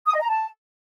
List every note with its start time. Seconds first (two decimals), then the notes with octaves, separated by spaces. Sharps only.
0.07 D#6
0.14 D#5
0.21 A#5
0.28 A5